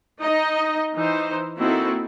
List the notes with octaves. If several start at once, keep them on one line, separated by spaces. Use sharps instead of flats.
D#4 D#5
E3 D#4 C5
A#3 C4 D#4 E4 F#4 A4